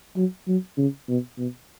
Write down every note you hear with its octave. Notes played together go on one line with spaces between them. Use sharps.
F#3
F#3
C#3
B2
B2